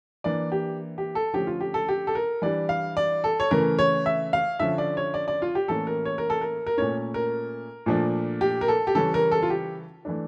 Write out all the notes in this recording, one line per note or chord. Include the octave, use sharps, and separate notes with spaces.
E3 A#3 D4 D5
G4
G4
A4
D3 F3 A3 C#4 G4
F4
G4
A4
G4
A4
A#4
E3 G3 D4 D5
F5
D5
A4
C#5
C#3 E3 A3 A#4
C#5
E5
F5
D3 F3 C#4 E5
D5
C#5
D5
D5
F4
G4
A2 E3 A#3 C#4 A4
A#4
C#5
A#4
A4
A#4
A#4
A#2 A3 C#4 C#5
A#4
A#2 F3 A3 D4
G4
A#4
A4
G4
C#3 E3 G3 C#4 A4
A#4
A4
F4
G4
E3 A3 D4